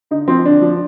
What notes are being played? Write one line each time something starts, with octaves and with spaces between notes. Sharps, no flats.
D3 D#4
F3 C4
D3 D4
F3